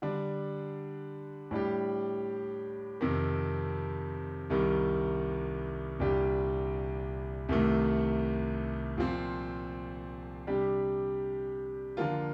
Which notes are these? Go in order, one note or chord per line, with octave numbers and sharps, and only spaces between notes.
D3 G3 D4
A2 G3 D4 G4
F2 C3 D#3
C2 C3 D#3 G3
C2 A#2 G3 D4 G4
C2 C3 D#3 A3
A#2 F3 C4
C3 G3 D4 G4
D3 F3 A#3 F4